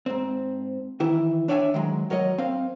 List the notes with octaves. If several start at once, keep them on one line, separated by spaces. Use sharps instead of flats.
G#2 C4
D#3 E3 E4
D4 C#5 D5 E5 F5 G#5
D#3 F#3 G#3
F#3 A#4 C#5 D#5
C4 F5